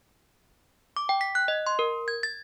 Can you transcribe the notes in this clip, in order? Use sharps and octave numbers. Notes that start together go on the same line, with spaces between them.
D6
G5
B6
F#6
D#5
C6
A#4
G#6
A6